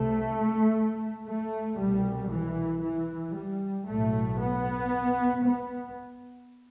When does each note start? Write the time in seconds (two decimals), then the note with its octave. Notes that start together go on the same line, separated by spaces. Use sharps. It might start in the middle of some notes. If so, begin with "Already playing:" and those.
Already playing: C2 C3 A3
1.26 A3
1.78 C2 B2 G3
2.31 E3
2.83 E3
3.35 G3
3.88 B1 A2 A3
4.40 B3
5.45 B3